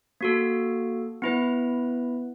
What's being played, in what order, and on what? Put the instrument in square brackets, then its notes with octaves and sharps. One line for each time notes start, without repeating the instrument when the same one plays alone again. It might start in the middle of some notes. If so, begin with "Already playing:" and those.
[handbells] A#3 F#4 A4
B3 E4 B4